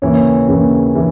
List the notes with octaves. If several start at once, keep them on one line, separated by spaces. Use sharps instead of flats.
D#2 C#3 E3 C#5
D#2 C#3 E3
C#3 E3